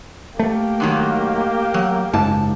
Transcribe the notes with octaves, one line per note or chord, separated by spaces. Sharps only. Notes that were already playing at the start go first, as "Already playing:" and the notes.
A3 A#3 G4
G#2 D#3 F#3
F#3
F#1 G#2 A5